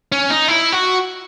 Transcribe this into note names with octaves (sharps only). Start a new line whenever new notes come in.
C#4
D#4
E4
F#4